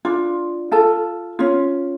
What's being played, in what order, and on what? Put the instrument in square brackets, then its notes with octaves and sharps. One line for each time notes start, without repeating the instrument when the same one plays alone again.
[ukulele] D4 F4
F4 A4 A5
C#4 F4